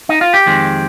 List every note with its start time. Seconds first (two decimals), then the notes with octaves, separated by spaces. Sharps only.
0.09 D#4
0.21 F4
0.34 G4
0.46 F2 D#3 G#3 C4